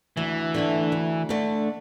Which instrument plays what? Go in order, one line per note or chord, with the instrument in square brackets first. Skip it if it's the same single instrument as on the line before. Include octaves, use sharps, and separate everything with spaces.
[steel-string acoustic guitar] D2 [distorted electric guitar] E3
[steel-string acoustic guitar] D3 A3 D4
D2
D3 A3 D4